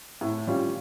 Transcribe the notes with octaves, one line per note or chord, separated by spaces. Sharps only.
A2
G3 C#4 F4